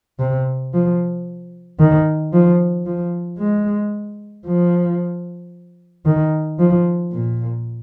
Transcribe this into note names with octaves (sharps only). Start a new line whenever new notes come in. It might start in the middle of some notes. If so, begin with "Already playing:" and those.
C3
F3
D#3
F3
F3
G#3
F3
D#3
F3
A#2